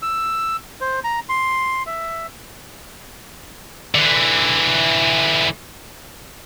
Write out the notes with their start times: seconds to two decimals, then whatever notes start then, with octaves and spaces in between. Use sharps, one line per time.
0.02 E6
0.81 C5
1.04 A#5
1.29 C6
1.86 E5
3.95 D3 E3